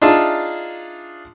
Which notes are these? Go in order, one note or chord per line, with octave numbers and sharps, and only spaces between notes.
D4 D#4 F4 G#4 E5 A5